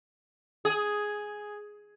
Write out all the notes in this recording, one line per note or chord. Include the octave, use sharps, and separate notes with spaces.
G#4